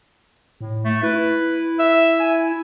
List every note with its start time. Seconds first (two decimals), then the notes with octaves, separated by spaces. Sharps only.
0.61 A2
0.85 A3
1.03 E4 B4
1.79 E5
2.20 G#5